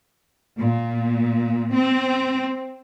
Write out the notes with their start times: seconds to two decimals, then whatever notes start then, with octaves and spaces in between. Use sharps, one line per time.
0.58 A#2
1.72 C4